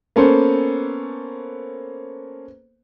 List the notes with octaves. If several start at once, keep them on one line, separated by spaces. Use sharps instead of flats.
A#3 B3 C#4 A4 B4 C5